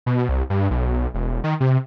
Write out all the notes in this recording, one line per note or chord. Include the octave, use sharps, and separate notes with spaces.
B2
C2
G2
B1
E1
D#3
C3